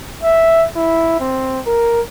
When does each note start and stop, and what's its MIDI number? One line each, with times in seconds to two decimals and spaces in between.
0.23 0.65 76
0.76 1.18 64
1.20 1.60 60
1.67 2.01 70